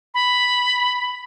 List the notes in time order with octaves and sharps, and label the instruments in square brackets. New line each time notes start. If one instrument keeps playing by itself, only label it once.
[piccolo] B5